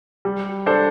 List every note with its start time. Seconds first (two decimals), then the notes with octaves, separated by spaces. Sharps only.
0.25 G3
0.66 D4 A4 C5